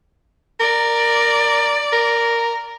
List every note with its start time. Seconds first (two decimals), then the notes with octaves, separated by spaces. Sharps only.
0.60 A#4 D5
1.93 A#4